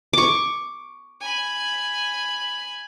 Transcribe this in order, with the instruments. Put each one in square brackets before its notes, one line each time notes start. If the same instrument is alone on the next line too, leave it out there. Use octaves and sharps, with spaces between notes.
[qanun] C#6 D6
[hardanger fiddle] G#5 B5